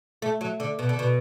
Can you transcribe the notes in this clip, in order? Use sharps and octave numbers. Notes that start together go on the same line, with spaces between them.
A3
F#3
D3
B2
D3
B2